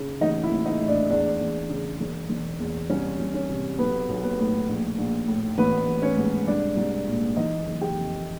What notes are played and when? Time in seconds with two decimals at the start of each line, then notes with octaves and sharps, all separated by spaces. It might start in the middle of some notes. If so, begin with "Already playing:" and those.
Already playing: C#3
0.21 A1 D#4 D#5
0.43 E4 E5
0.51 A1
0.66 D#4 D#5
0.81 A2
0.88 D4 D5
1.10 E2 D4 D5
1.41 E2
1.70 C#3
2.00 E1
2.30 E1
2.60 E2
2.90 C2 C#4 C#5
3.19 C2
3.34 C#4 C#5
3.50 C3
3.78 B1 B3 B4
4.09 B1
4.23 B3 B4
4.39 A2
4.69 A#1
4.98 A#1
5.28 A2
5.58 A1 B3 B4
5.87 A1
6.02 C#4 C#5
6.17 G#2
6.47 C2 D4 D5
6.77 C2
7.07 A#2
7.36 E3 D#4 D#5
7.66 F#1
7.81 G4 G5
7.96 F2